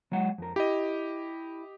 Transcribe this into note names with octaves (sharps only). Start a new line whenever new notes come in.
F#3 G#3 F#5
F2 A#4
E4 G4 D#5